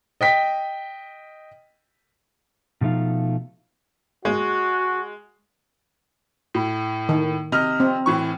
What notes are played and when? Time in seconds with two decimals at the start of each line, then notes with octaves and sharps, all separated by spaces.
0.21 D#5 G5 B6
2.81 B2 F3 A3 D#4 F5
4.25 G#3 F#4
6.55 A2
7.09 D#3
7.52 C3 D#5 F6
7.80 C4
8.06 A2 E3 C#6